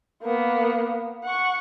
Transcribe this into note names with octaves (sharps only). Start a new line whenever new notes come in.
A#3 B3
F#5 C#6